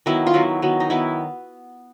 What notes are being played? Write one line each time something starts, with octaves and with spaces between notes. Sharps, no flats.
D#3 F#3 B3 E4
F4
D#3 F#3 B3 E4
D#3 F#3 B3
D#4
D#3 F#3 B3 E4